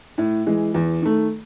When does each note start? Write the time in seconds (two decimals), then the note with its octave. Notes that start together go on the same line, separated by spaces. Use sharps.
0.18 A2
0.46 E3 G#3
0.74 E2
1.02 D#3 A3